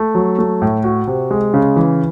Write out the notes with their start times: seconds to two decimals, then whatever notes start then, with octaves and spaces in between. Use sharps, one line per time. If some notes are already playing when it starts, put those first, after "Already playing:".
Already playing: A3
0.15 F#3
0.39 A3
0.62 A2
0.84 F#4
1.07 C3
1.31 G#3
1.54 C#3
1.76 E3